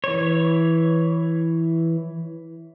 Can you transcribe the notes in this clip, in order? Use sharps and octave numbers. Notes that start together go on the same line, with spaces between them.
E3 C#5